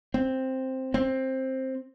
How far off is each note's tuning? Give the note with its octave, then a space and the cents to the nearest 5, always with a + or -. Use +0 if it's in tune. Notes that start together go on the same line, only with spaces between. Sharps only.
C4 +5
C4 +10